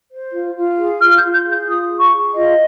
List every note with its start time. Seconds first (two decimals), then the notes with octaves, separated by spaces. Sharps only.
0.10 C5
0.32 F4
0.55 F4
0.77 G#4
0.99 F4 F6
1.10 F6
1.16 G6
1.22 F4
1.33 G6
1.44 G#4
1.49 G6
1.67 F4 D#6
1.89 G#4
2.01 C#6
2.11 G#4
2.34 F4 D#5